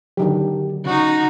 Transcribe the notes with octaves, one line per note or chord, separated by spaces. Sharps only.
D3 D#3 F#3 G4
C#3 D#4 F#4